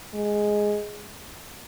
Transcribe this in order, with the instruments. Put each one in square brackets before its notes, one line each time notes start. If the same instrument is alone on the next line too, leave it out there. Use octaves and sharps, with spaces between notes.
[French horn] G#3